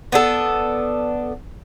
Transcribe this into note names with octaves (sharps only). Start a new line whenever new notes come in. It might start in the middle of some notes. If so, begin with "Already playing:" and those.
B3 D4 A4